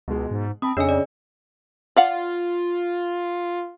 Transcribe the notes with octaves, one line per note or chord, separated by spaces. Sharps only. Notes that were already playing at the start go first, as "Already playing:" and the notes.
C#2 B2 G#3
G#2
C4 A5 B5 D#6
F2 C#3 D4 D#5 G#5 E6
D5
F4 D5 F5 F#5